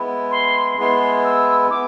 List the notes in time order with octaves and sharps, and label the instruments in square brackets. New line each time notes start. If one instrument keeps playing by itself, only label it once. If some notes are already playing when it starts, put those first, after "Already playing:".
Already playing: [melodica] G#3 B3 E4
[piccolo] C6
[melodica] G#3 B3 E4 [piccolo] C6
[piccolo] E6
[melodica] B3 E4 [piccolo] D6